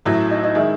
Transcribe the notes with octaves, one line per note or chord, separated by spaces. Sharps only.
A1 A2 F#3 E4
D#4
D#4
D#3 G#3 E4